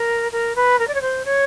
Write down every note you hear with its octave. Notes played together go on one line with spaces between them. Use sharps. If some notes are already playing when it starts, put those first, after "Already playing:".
Already playing: A#4
A#4
B4
A#4
D5
C#5
C5
C#5